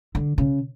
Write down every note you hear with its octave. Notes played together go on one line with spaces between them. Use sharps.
D3
C#3